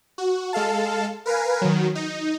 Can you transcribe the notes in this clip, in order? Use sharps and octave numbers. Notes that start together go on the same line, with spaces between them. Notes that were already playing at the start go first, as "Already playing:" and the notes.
F#4
G#3 A4 F5 A5
A#4 B4 F5 G#5
D#3 F#3
D#4